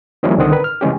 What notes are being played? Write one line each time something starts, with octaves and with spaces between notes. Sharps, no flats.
D#3 F3 G3 A#3 C#4 E4
C2 D3 D#3 C4 F#5 D#6
A#4 B4
F6
C#3 E3 G#3 C#4 G4